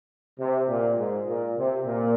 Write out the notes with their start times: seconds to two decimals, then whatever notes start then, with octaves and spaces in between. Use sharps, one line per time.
0.40 C3
0.69 A#2
0.98 G#2
1.28 A#2
1.58 C3
1.86 A#2